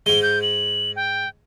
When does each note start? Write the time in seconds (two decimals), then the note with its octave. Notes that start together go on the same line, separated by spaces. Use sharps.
0.06 G#2 G#3 G7
0.23 G6
0.42 F#7
0.96 G5